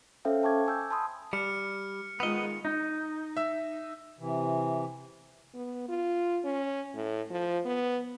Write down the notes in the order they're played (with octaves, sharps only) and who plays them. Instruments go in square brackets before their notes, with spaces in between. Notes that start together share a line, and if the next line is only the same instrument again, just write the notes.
[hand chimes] C#4 A4 C5 E5 F5 G5
G5 A5 C#6 D6 G#6
G#5 E6 G6
A5 B5 C6 D#6
[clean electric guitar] G3 [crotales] F6 C#7
[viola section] D#3 G#3 F4 [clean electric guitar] B3 D#5 [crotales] F7
[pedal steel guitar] D#4
[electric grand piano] E5 E6
[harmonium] C3 E3
[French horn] B3
F4
C#4
A2
F3
B3